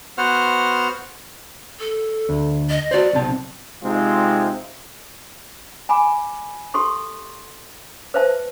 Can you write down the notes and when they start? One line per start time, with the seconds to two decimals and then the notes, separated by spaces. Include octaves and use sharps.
0.18 B3 F#4 C5 F#5 F6
1.80 A4
2.29 D2
2.69 D#5
2.91 F#4 C5 D5
3.13 B1 C3 A5
3.83 C3 G#3 C4 D#4 F4
5.89 G#5 B5 D6
6.74 G4 A4 C6 C#6
8.14 B4 C5 E5 A5